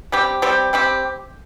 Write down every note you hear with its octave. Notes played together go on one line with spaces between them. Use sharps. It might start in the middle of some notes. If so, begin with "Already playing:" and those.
G3 C4 G4
G3 C4 G4
G3 C4 G4